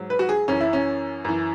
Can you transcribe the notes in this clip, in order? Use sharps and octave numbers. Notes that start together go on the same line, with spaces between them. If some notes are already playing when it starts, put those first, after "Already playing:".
Already playing: G#2 F#3
B4
F#4
G#4
F#2 E3 C#4
E4
C#4
F#2 E3